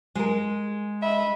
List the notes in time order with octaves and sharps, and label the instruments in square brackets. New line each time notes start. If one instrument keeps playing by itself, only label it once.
[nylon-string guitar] G#3 A#4
[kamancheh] D#5 B5 [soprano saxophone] E5